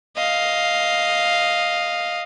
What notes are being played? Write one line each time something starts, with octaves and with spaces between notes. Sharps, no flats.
D#5 F5